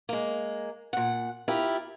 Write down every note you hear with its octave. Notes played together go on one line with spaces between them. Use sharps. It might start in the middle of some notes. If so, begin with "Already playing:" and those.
G#3 A#3
A#2 F#5
E4 F4 G4 A#4